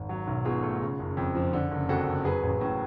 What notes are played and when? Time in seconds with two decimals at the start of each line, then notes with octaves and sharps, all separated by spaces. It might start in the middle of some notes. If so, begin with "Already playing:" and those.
Already playing: G#1
0.09 F#3
0.27 B1
0.45 B2 F4 G#4
0.63 A3
0.81 C#3
0.99 F#1
1.17 F2
1.35 F3
1.53 D3
1.71 F#1
1.89 F2 F#4 A4
2.07 F#1
2.25 F#3 G#4 B4
2.43 A1
2.61 A2